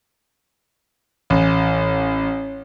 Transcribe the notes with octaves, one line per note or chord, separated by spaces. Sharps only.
A1